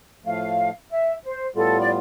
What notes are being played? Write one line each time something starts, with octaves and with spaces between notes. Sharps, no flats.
A2 F3 A3 F5
E5
C5
A2 G3 B3 F4 A4
D5